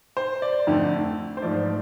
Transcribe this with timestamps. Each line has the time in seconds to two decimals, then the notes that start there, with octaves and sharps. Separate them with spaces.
0.17 C5
0.42 D5
0.67 F2 D3 A3
1.37 C5
1.42 G#2 F3 A3 D5